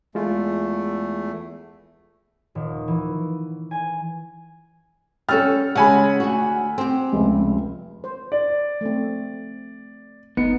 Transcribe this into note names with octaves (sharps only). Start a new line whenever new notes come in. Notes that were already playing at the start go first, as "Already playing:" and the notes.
E2 G#3 A3 F4
D#1
E3
G#5
G3 C#4 A4 G5 E6 F6 A6
C#3 G#3 F#5 G#5 B5
D2 F#4
C4 G4
F1 C#2
C5
D5
A3 C4
G1 B3 D#4 C#7